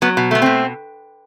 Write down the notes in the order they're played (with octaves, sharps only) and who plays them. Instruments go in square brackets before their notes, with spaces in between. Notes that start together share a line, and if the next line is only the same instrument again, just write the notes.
[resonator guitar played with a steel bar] F#3 B3
B2
A3 B3
B2 C4